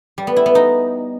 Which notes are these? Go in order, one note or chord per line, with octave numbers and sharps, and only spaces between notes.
G3
B3
E4
B3
D#4